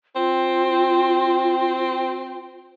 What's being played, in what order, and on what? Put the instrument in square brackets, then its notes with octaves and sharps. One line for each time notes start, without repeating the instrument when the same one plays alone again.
[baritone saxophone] C4 [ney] F4